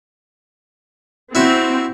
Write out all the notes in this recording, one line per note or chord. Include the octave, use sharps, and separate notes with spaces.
C4 E4 F#4 E5